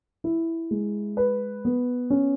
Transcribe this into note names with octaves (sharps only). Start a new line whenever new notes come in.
E4
G#3
B4
B3
C#4